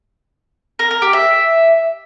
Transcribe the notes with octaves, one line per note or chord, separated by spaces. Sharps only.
A#4
A#4
G4
E5